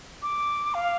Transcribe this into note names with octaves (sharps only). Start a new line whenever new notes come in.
D6
F5